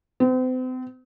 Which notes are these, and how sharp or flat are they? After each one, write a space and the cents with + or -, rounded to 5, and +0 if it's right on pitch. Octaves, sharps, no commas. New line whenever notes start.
C4 -40